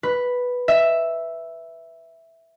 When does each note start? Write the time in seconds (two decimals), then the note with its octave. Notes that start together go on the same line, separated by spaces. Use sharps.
0.03 B4
0.68 E5